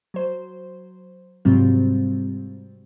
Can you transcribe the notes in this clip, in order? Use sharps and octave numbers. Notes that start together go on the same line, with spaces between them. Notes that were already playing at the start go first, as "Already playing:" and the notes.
F#3 C5
G#2 C3 F#3 G3 C4 F4